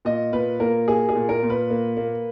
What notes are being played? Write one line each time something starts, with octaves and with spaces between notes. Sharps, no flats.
A#2 D#5
A#2 B4
A#3 A#4
A#3 G#4
G#4
A#2
A#4
A#2
B4
A#3
A#3